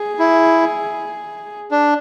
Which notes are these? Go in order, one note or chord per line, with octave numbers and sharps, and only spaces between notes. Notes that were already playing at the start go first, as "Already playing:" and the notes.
Already playing: G#4
E4
D4